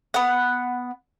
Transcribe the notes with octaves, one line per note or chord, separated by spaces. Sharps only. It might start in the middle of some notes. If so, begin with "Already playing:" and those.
B3 F#5